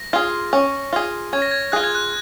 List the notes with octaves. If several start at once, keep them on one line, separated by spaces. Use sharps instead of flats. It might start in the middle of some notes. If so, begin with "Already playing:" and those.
Already playing: A#6
F4 G#4
C#4
F4 G#4
C#4 G#6
A#6
G#6
F4 G#4 F#6
G#6
F#6